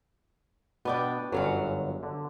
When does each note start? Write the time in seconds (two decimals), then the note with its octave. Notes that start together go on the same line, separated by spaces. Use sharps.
0.85 B2 B3 D4 G5
1.32 G1 F#2 F#3 C#4 F5 F#5
2.03 D3